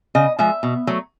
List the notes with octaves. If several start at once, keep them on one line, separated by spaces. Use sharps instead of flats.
C#3 D#5
F3 G#3 E5
B2
F#3 A3